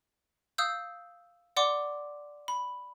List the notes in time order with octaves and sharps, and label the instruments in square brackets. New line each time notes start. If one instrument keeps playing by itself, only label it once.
[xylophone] F5 D#6 E6 G6
D5 F#5 C6 D6
B5